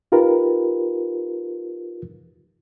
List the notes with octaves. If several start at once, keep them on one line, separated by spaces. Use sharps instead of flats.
D#4 F4 G4 A#4 B4